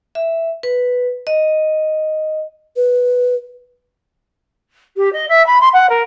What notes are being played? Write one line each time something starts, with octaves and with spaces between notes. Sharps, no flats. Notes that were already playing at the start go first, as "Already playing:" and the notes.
E5
B4
D#5
B4
G4
D#5
E5
B5
C6
F#5
A#4